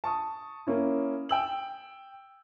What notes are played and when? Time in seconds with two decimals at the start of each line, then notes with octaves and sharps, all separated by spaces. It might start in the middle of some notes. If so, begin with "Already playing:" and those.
0.04 A5 C#6 D#6
0.67 A#3 C#4 E4
1.29 G5 E6 F#7